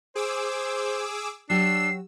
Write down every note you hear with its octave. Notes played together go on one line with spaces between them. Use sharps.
G#4 C5 D6 E6
F#3 D4 G4 C#5 E6 C7